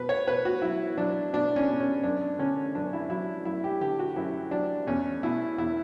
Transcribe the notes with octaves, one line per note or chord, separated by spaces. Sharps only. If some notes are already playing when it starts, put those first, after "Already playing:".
Already playing: B2 B4
C#5
B2 B4
F#4
F#3 E4
F#3 D4
B2 D4
C#4
B2
C#4
F#2 D4
D3 C#4
F#2 D4
E4
F#3 E4
F#2 E4
G4
D3 G4
F#4
F#2 E4
F#3 D4
E2 C#4
B2 E4
E2 E4